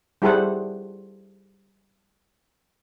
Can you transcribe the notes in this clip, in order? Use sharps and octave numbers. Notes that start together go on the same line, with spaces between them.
G3 E4 G#4 A4 C5 F#5